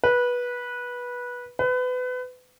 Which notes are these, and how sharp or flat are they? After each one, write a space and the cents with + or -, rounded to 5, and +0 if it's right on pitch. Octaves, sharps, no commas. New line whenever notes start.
B4 -15
B4 +30